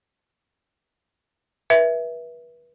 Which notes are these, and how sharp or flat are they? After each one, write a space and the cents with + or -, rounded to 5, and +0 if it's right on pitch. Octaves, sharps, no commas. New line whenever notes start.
B4 -35 E5 +0